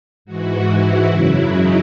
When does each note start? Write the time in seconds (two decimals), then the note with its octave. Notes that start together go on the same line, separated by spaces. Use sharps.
0.25 G#2 E3 F#4
0.66 E4
1.09 F#2 C#3 F#3
1.51 D#4